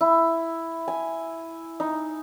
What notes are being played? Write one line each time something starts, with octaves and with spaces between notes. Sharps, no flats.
E4
G#5
D#4